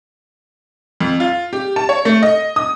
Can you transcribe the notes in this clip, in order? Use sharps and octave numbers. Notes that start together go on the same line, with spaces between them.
F2
F4
G4
A5
C#5
A3
D#5
D#6